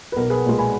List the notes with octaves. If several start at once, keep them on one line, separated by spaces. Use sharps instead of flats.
B4
B1 A#4
G#4 B4
A#2 G#3
G#5 B5